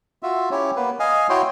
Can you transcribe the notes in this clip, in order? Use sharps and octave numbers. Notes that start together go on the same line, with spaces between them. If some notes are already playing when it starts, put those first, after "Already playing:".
F4 F#4 E5
C#4 E4 G4 C#5
A#3 B3 B4
D#5 F5 G#5
E4 F#4 C#5 G5 C6